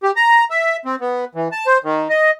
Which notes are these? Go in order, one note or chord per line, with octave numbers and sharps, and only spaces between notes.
G4
A#5
E5
C4
B3
E3
A5
C5
D#3
D#5